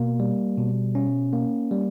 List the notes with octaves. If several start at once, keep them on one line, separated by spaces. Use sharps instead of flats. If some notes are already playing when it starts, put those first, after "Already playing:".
Already playing: B2 A#3
G3
B2
C#4
A#3
G3